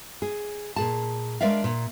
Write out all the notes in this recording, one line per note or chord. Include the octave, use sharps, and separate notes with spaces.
G#4
A#2 G#4 A5
G#3 D4 A#4 D5 E5 F5
A#2